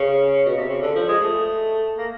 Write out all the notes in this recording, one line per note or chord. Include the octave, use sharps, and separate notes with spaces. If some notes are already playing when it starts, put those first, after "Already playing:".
Already playing: C#3
B2
C3
C#3
D3
F3
G#3
A3
A#3